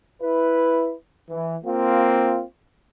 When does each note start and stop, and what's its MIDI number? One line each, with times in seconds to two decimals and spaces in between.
0.22 0.94 64
0.22 0.94 71
1.29 1.55 52
1.65 2.42 58
1.65 2.42 60
1.65 2.42 65